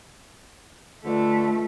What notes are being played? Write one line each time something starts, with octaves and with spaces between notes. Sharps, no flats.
D3 A3 F4 B4 D#5